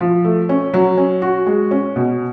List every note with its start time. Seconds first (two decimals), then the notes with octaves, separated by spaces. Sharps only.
0.01 F3
0.24 A3
0.49 C#4
0.74 F#3
0.97 C#4
1.22 F#4
1.46 G#3
1.71 C#4
1.96 B2